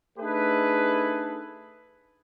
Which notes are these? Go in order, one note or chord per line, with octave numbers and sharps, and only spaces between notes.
A3 D4 D#4 G#4 A4 B4